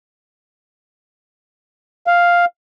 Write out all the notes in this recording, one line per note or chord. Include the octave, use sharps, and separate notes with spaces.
F5